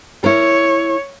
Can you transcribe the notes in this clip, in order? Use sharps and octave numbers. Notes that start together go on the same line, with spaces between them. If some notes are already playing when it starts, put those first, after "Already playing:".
E4 A#4 C#5